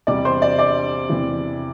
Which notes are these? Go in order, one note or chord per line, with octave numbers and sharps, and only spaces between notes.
E2 C3 G3 D5 D6
C5 C6
D5 D6
D5 D6
E2 C3 E3